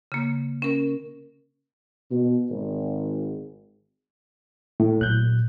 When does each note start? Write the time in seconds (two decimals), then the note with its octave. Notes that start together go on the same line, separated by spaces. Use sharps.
0.12 C#3 A#3
0.62 C#4 A#4
2.10 B2
2.50 G#1
4.80 A2
5.01 A#2 F#3 F#6 G6